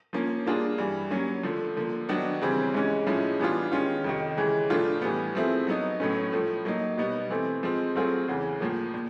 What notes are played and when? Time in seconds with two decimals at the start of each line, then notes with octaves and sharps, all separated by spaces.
0.13 F3 A#3 C#4
0.46 G3 A#3 D4 F4 G#4
0.78 G2 E3 G3
1.11 F#3 A#3 C#4
1.43 D3 F3 A3
1.77 D3 F3 A#3
2.09 D#3 F#3 B3 D4 F#4
2.42 C#3 E3 G3 C4
2.74 G#2 E3 G#3 C#4
3.07 A2 F3 G#3 C#4 E4
3.39 E3 G3 B3 D4 F4
3.72 D#3 G#3 C#4 F4
4.04 F2 C3 D#3
4.37 C#3 E3 G#3
4.70 A2 F3 A3 D4 F4
5.02 A2 E3 G3 B3
5.35 F3 A3 C4 E4 G#4
5.67 F#3 B3 D#4
6.00 A2 F#3 A3 C#4
6.32 A2 F3 A3
6.65 F#3 A#3 D#4
6.98 B2 G3 B3 D#4
7.30 E3 A3 C4
7.63 F3 G#3 C4
7.96 F#3 A3 C4 F4 G#4
8.28 E2 C#3 E3
8.60 A2 F3 A#3
8.94 A#2